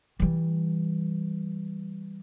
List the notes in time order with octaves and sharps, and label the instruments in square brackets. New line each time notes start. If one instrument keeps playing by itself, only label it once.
[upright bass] E3 G3